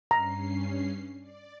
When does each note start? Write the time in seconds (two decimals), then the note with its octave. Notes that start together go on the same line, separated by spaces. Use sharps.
0.11 G2 C#4 A#5 C7
1.20 D5